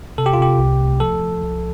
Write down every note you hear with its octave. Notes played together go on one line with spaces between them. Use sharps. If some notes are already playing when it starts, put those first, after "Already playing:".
C3 A4
G4
F4
C3 G4
C2
A3
F3 A4
F3
C2